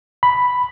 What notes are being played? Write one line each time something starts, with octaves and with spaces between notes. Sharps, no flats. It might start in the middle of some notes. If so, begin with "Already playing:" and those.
B5